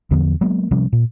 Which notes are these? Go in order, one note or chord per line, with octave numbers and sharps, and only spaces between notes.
E2 D3 F3 B3
F#3 G#3 A#3 B3
C3 F3 G3 C#4
A#2